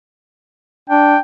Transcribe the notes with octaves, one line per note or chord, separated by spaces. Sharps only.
D4 G5